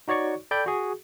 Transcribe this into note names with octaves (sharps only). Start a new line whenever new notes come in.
D#4 F#4 C#5 D5 C#6
A4 D5 G5 B5 G6
F#4 G#4